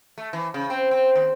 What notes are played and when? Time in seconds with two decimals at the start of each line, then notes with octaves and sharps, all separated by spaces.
0.18 A3
0.33 E3
0.54 C#3
0.70 C4
0.91 C4
1.16 D#2